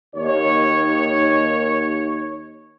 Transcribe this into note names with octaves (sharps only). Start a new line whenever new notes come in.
D#2 C#5